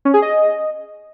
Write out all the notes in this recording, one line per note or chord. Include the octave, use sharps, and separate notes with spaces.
C#4
G#4
D#5